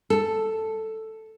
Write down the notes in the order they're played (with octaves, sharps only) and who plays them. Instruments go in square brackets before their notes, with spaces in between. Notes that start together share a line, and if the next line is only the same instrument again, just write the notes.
[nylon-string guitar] A4